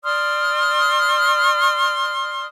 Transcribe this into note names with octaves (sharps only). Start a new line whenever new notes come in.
D5 C6 D#6 F6